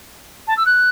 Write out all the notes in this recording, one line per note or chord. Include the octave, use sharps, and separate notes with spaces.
A5
E6
F#6